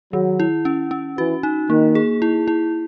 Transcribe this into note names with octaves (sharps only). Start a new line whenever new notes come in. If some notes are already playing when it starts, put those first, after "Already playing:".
D#3 F#3
E4
C#4
C#4
E3 F#4
D#4
D#3 A#3
G#4
E4
E4